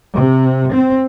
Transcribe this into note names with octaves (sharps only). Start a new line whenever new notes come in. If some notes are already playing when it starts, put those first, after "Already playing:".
C3
C4